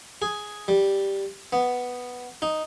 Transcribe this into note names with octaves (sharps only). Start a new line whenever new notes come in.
G#4
G3
B3
D#4